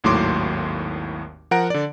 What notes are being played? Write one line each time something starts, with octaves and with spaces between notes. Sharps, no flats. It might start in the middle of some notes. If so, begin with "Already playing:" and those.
G#1 D#2 A2 F#3 C6 D6
F3 A#4 F#5 A#5 D7
D3 D5